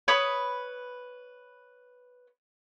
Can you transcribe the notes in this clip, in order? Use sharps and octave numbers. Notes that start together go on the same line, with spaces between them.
B4 C#5 B5 D#6